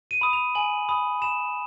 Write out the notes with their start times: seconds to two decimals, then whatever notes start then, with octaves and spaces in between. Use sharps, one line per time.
0.11 D#7
0.21 B5 D#6
0.33 F7
0.55 G#5 F#7
0.89 B5 D#6
1.22 B5 E7